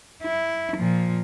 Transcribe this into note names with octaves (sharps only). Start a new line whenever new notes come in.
E4
A#2 F3